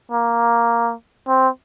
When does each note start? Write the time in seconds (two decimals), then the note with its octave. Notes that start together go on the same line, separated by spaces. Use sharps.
0.12 A#3
1.28 C4